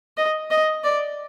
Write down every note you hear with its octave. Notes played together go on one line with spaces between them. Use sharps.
D#5
D#5
D5